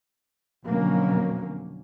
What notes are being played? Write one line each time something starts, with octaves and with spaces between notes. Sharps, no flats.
F2 B2 D3 F#3 A#3 C#4